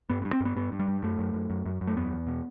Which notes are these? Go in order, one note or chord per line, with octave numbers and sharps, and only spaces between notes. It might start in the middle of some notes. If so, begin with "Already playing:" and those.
G2 B3
B3
G2
C4
G2 B3
G2 B3
G2
G3
G2
F#2 A3
F#2
F#2
F#2
F#2
F#2
A3
E2 B3
E2
B2